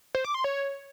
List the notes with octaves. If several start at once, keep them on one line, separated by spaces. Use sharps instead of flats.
C5
D6
C6
C#5